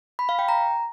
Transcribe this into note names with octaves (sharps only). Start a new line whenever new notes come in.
B5
F5
G5
A#5